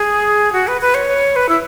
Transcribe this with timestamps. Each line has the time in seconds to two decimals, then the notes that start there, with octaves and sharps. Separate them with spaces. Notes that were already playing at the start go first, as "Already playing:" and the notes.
Already playing: G#4
0.53 F#4
0.68 B4
0.81 B4
0.95 C#5
1.36 B4
1.49 E4